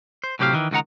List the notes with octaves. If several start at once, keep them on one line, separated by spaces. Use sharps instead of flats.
C5
A2 C3 F#3 G4 D5 F5
D#3 E3
C#2 D#3 D#4 F#5 A#5